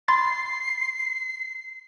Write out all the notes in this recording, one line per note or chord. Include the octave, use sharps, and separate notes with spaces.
B5 C6 A6 C7